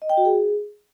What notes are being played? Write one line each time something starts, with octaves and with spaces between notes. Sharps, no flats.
D#5
G5
F#4
G#4